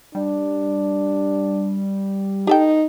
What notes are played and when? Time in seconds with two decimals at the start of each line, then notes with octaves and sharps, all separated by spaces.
0.15 G3 D4
2.47 D#4 G4 A4 G5